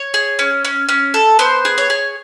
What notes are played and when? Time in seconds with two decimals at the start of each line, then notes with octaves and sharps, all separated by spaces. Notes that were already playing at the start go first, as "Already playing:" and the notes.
Already playing: C#5
0.14 G#4
0.39 C#4
0.65 C#4
0.89 C#4
1.14 A4
1.39 B3 C5
1.65 G#4
1.78 C#5
1.90 G#4